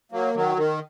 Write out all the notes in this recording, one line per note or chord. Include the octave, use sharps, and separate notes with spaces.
F#3 A#3
D#3 F#3
D#3